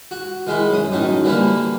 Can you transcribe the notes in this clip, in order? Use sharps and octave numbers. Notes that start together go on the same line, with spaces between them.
F#4
D#3 G#3 E4
F#2 D#6
F#2 A2 D#3 D#4
D3 E3 G3 A#3 E4